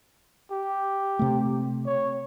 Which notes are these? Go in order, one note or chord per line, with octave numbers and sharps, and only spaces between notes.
G4
C3 A3
C#5